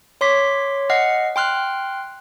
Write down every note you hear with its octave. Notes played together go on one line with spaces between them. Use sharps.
C#5 C6 D6 B6
D#5 F#5 F6 C7
G5 C6 F6 F#6